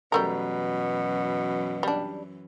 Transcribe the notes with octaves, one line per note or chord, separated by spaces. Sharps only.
F#2 B2 E3 G3 A3 A#4
G3 D4